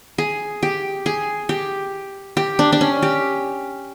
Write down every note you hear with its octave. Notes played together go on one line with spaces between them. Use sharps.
G#4
G4
G#4
G4
G4
D4
D4
C#4
G4